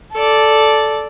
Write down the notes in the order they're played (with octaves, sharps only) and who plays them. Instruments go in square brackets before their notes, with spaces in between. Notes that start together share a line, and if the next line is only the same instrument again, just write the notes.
[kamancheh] A4 D5